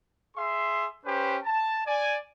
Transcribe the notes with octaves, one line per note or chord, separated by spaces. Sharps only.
G#4 E5 C6
C#4 G4 B4 C5
A5
D5 G#5